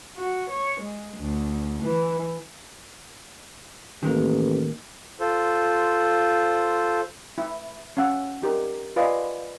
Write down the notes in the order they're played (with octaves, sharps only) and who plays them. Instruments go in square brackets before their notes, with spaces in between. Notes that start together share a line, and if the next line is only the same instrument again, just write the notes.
[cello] F#4
C#5
G#3
D2
E3
[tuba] A1 [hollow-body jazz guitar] D#3 G#3 A#3
[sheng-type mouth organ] F4 A4 C5
[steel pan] E4
C#4 F5 F#5 E6
D#4 G4 A#4
F4 B4 D5 D#5 F5 G#5